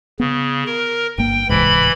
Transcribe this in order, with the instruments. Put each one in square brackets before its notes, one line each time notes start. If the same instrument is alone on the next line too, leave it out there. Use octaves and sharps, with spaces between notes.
[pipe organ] C#3 [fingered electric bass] B3
[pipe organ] A#4
[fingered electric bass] G1 A#3 [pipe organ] G5
[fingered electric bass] D1 C2 G#2 [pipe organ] E3 B5